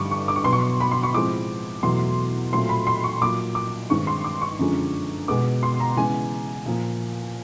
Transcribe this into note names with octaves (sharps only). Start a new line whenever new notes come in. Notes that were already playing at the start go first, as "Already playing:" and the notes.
Already playing: G2 D3 G3 C#6 D6
C#6
D6
C#6
B2 F#3 B3 C6
C#6
B5
C6
C#6
A2 F3 G#3 C4 D6
E2 B2 F#3 A3 C6
A#2 F#3 A3 C4 C6
B5
C6
C#6
A#2 F#3 A#3 D6
D6
G2 D#3 G#3 C4 C#6
C6
D6
C#6
F#2 D3 F3 G#3 C4
B2 G#3 B3 D6
C6
A#5
C#3 E3 G#3 B3 G#5
A#2 F3 A#3